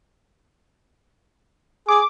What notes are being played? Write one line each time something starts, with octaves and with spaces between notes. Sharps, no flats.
G#4 D6